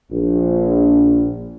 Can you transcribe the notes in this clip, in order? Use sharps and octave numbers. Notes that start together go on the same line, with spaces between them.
A#1